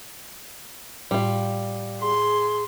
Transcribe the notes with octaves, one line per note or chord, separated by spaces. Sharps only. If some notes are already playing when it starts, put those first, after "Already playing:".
A2 G3 F4
G#4 C6